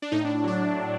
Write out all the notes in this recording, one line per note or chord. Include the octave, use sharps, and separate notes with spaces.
D4
A2 D#4
A2 D4
F#3 D4
A2
A2